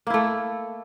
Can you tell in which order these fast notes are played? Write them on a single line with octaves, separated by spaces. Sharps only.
A#3 E4 A3